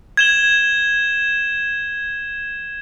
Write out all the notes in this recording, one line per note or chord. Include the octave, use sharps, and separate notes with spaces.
G#6 E7 G7